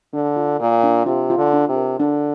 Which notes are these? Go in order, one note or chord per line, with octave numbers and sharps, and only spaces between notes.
D3 D4
F4
A#2 A#4
D4
C3 F4
F4
D3
D4
C3
A#4
D3 D4